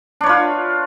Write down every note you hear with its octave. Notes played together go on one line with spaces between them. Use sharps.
D4 F4 B4 C#5